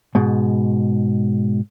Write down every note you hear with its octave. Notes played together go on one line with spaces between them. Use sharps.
G#2 B2